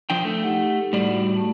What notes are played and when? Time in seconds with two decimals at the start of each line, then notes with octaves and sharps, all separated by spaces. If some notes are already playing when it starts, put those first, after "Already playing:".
0.10 F3 D4 G5
0.25 A3
0.43 D#4 G4 F#5
0.93 A2 G3 F#4 D5
1.35 A3 A5